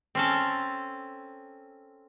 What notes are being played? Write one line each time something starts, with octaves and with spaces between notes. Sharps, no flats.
C4 C#4 A4